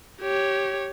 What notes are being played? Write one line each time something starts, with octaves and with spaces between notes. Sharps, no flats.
G4 C#5